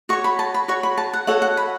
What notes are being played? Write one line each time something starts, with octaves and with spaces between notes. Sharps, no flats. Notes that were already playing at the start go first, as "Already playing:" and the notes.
F#4 C#5 C#6
B5
A5
B5
F#4 C#5 C#6
B5
A5
F#5
F#4 A4 C#5 F#5
F#5
B5